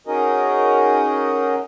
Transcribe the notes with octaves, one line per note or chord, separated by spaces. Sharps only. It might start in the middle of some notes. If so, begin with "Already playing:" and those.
C#4 D#4 F#4 G#4 A#4 D#5